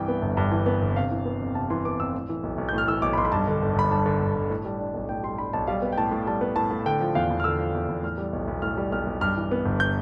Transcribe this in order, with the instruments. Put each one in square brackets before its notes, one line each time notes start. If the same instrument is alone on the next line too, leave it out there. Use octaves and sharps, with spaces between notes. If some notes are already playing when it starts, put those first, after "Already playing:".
Already playing: [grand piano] C2 G2 E3 G5
B3
G1
G2
E3
B3
G1
C3 F5
E3
B3
F2
C3 A5
E3 C6
B3 D6
F2 E6
A2
E3
B1
B1
A2 G6
F6
E3 E6
B1 D6
B5
B1 C6
B5
G2 A5
D3
G1
G1 B5
G2 A5
D3
G1
G1
A2
G3
D4
B1
A2 G5
G3 C6
D4 B5
B1 A5
G3 F5
B3
G5
A2 A5
A2
G3 A5
B3
A2 A5
A2
D3 G5
F3
E2 F5
E2
F6
D3 E6
F3
E2
E2
A2 F6
G3
B1
B1
A2 F6
G3
B1 F6
B1
G2 F6
E3
B3
G1
G6